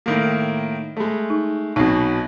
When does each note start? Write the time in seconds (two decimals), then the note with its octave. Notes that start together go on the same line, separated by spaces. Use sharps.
0.06 A2 D#3 A#3
0.97 G#3 A3
1.30 D#4
1.76 B1 B2 C4 D#4